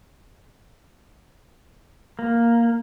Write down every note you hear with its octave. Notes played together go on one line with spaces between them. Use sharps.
A#3